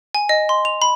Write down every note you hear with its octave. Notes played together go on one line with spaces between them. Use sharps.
G#5
D#5
C6
F7
B5